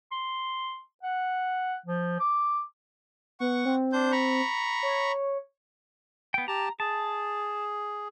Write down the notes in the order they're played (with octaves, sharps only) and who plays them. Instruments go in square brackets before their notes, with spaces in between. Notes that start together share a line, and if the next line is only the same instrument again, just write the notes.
[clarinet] C6
F#5
F3
D6
[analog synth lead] B3 [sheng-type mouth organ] F#5 C#6
[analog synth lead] C4
[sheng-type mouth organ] D4 C5 G6
A#5 B5 C#6
[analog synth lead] C#5
[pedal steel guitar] B3 G5
[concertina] G4 A5 [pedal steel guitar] A#5
[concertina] G#4 [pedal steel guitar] A5